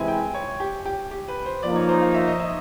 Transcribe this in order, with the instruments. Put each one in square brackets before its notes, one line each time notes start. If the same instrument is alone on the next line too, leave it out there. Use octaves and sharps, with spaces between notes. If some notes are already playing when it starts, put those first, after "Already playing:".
Already playing: [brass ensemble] C3 E3 G#3 C4 E4 [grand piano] G#5
[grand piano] G5
C#5
G4
G4
G4
B4
C5
[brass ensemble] F3 A#3 D#4 [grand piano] D5
[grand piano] C#5
C5
F5
E5
D#5
E5